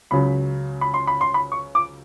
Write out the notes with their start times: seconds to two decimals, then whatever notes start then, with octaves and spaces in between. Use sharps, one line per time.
0.11 C#2 C#3 F#3 B5
0.81 B5
0.94 C6
1.07 B5
1.21 C6
1.34 B5
1.52 C#6
1.75 D6